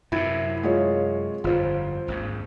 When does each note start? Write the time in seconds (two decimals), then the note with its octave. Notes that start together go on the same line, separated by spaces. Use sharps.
0.12 F#2 C3 E4
0.63 G#3 F4 C#5
1.44 G1 F2 F4 C5
2.08 G#1 D#2 G#2